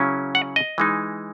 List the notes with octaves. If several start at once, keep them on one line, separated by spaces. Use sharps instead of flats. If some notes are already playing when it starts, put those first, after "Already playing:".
Already playing: C#3 F#3 C#4 E4
F#5
D#5
E3 G#3 D#4